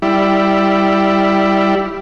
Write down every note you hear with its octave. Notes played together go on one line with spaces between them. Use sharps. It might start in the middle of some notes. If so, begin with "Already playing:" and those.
G3 E4